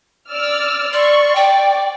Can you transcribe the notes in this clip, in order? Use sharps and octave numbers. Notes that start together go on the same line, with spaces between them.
D5 E6 F6
D5 C6 C#6
D5 G5